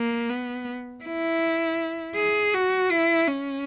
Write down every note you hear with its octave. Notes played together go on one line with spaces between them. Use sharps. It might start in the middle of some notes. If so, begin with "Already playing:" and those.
Already playing: A#3
B3
E4
G#4
F#4
E4
C#4